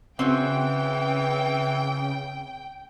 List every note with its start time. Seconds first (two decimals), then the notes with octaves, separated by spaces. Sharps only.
0.19 C#3 E3 C4 C#4 F#4 G5